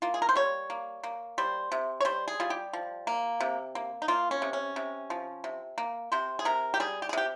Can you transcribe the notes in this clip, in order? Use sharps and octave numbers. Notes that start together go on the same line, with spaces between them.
A#3 F4
G#4
A#4
C5
G3 C#5
A#3
A#3
G3 C5
C3
C#5
G3 C5
G#4
G3 F4
G4
F3
A#3
C3
A#3
D#4
A#3 F4
C#4
C3
C#4
C3
F3
C3
A#3
C3 C5
G#4
C3 A#4
G4
G3 G#4
G4
G#4
C3 G4